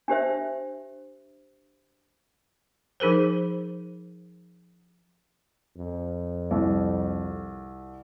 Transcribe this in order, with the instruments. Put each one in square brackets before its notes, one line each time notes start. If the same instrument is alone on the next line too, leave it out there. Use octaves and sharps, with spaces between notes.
[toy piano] D4 G4 C5 E5
[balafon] F3 D#4 G#4 A#4 C5
[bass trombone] F2
[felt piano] C2